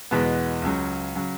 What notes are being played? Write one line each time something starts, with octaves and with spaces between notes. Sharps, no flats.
E2 B2 G#3 B3
C#2 C#3 F#3
C#3 F#3